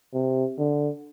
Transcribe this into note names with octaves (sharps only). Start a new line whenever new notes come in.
C3
D3